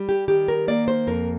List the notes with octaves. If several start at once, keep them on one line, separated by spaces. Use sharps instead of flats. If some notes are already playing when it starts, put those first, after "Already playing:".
Already playing: G3
G4
D#3 G4
A#4
A#3 D5
C5
F2 A#4